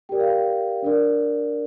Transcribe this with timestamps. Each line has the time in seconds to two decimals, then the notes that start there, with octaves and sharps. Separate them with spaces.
0.09 G4 A#4 D5 G5
0.20 F5
0.28 G5
0.82 D4 A#4 D5